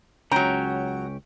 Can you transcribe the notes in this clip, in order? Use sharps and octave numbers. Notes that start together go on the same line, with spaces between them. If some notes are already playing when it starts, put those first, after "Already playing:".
C#2 F#3 C#4 G5 A#5